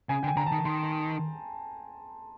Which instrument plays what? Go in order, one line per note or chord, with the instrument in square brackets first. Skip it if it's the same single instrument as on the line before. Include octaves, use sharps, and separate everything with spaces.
[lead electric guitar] C#3 [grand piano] G#5
[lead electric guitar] D3 [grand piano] G5
[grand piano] G#5
[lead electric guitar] D3 [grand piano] A#5
[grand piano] A5
[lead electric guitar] D#3
[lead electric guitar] D#3 [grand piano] C6